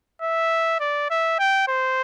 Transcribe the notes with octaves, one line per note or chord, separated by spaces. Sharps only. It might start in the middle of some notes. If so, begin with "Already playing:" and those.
E5
D5
E5
G5
C5